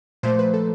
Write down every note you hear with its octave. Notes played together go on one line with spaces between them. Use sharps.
A#2 F3 A3 C5
B4
A4